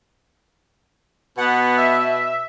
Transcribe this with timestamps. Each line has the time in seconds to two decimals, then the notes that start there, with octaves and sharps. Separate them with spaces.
1.37 B2 B3 F#5
1.77 E5